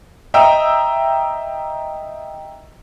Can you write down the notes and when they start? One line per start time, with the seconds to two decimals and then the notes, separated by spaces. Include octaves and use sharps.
0.34 D#5 E5 G5 A#5 D#6 E6